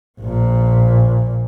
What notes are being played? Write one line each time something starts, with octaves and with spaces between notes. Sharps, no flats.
A#1 A#2